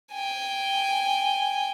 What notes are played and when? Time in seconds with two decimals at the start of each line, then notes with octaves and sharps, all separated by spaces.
0.12 G5 G#5